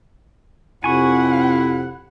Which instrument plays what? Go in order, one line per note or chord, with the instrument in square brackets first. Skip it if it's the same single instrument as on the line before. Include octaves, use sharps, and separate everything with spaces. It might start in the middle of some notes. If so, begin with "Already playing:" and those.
[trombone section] F2 C3 [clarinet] E4 [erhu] F#5 [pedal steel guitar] G#5 C#6